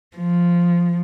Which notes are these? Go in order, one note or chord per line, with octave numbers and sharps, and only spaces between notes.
F3